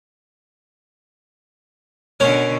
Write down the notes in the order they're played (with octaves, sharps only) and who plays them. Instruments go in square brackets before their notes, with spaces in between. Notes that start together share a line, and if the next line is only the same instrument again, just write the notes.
[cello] B2 D3 [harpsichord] C#4 A#4 C#5